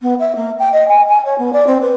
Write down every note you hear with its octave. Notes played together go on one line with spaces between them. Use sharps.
B3
E5
A#3
G5
D#5
G#5
G#5
C#5
B3
D5
C4
B4